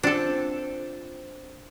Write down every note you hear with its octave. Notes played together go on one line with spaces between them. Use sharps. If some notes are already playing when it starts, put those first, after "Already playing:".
C4 D4 F4 A4